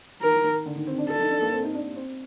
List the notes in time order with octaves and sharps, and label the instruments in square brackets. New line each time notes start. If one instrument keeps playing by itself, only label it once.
[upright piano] D#3 [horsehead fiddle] A#4
[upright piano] D#3
D3
D#3
C4
D4
[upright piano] D4 [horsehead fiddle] A4
[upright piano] D#4
D4
A#3
C4
D#4
D4
C4